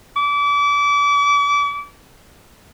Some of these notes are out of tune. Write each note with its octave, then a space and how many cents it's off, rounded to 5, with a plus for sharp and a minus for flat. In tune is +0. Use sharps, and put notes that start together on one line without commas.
D6 -30